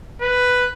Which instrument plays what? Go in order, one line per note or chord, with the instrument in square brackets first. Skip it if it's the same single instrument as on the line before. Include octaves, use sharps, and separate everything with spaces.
[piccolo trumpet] B4